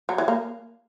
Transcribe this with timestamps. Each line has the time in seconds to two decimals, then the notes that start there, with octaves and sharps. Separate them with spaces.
0.09 F#3
0.18 E3
0.28 A#3